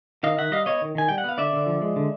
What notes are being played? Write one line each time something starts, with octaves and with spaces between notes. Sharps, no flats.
D#3 D#5 F5
D#3 E5 F#5
G3 D#5 F5
B3 C#5 D#5
D#3
D#3 G#5
G3 G5
F#5
B3 F5
D3 D5 E5
D3
F3
G#3
D3